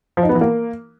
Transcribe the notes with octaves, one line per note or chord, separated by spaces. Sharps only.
F3
D#4
B3
E3
A#3